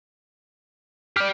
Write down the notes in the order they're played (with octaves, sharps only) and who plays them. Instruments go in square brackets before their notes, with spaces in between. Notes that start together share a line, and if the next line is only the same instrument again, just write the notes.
[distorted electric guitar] G4 D5 [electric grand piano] F6